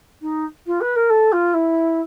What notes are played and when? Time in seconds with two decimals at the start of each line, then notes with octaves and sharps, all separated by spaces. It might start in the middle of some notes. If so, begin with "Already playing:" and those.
0.21 D#4
0.66 F4
0.80 B4
0.96 A#4
1.10 A4
1.32 F4
1.54 E4